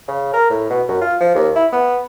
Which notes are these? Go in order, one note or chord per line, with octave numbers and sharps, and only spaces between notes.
C#3
A#4
A2
B2
F#2
F4
F3
D#2
E4
B3